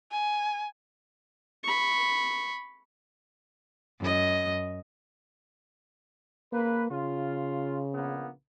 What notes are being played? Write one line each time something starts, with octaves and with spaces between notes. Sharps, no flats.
G#5
B5 C#6
F#2 D#5
C#3 A#3 B4
C#3 F4
A#1 A#3 B3